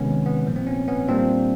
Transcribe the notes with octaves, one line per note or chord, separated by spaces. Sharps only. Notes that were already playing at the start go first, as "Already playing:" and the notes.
Already playing: C3 D#3 G#3 B3 C#4
B3
A#2 F3 A#3
C4
B3 C#4
B3 C#4
A#2 G3 A#3 C4 D4